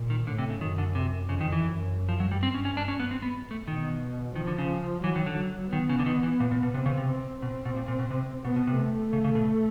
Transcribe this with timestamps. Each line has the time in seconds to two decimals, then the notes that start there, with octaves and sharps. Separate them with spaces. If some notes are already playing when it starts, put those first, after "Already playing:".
Already playing: A#2
0.10 D#3
0.27 A2 D3
0.39 C3
0.50 C#3
0.61 F#2 D#3
0.78 D3
0.95 C3
1.29 F2 C#3
1.41 D#3
1.52 E3
1.63 F#2
2.09 F3
2.20 F#3
2.31 G2 G3
2.43 C4
2.54 C#4
2.65 C#4
2.77 D4
2.88 C#4
3.00 B3
3.11 C4
3.22 B3
3.51 A3
3.68 B2 D#3
4.35 D#3 F3
4.47 D3
4.58 C#3
5.04 E3 F#3
5.16 D#3
5.26 D3
5.73 D#3 B3
5.89 C#3
5.99 D3
6.06 D#3
6.23 E3
6.40 A#2
6.51 A#2
6.63 B2
6.74 C3 C4
6.86 C#3
6.97 C3
7.08 C4
7.42 B2 C4
7.65 B2
7.76 A#2
7.88 A#2
7.99 B2
8.11 C3
8.44 B2 B3
8.56 B2
8.67 C3
8.78 A3
9.13 C#3
9.24 C#3
9.35 B2